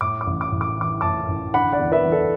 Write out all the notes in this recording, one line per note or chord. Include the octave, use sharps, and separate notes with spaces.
A2 D6
D6
A1
D6
A1
D6
E3 D6
A2 A5 D6
A1
D3 F#5 B5
D5 F#5
E2
B4 E5
E2
A4 D5